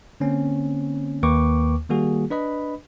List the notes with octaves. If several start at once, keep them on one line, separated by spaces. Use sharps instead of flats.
D3 A#3 C4 C#4
D#2 A#3 B4 G5 C#6 D6
D#3 G3 A#3 F#4 G#4
D4 B4 D#5 B5